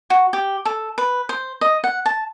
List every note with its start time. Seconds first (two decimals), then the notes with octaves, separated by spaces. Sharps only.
0.10 F#4
0.33 G4
0.65 A4
0.98 B4
1.29 C5
1.61 D#5
1.84 F#5
2.06 A5